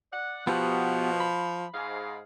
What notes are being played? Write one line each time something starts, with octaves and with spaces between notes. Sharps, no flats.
D5 F#5
B2 F3 B3 G4 F#5
B5
G#2 G#4 F5